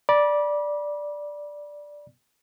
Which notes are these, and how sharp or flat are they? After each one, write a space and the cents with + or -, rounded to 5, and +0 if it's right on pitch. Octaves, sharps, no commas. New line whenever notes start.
D5 +0 B5 -35